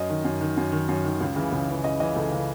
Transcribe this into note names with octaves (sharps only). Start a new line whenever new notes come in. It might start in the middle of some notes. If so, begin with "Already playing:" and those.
Already playing: F#2 D#5
D#3
F#2
D#3
F#2
D#3
F#2
D#3
C#2
C#3 E3
C#2
C#3 E3
C#2 D#5
C#3 E3 D#5
C#2 A4
C#3 E3